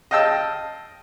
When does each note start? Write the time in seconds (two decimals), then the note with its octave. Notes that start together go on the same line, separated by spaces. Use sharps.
0.11 D#5 F5 G5 A5 E6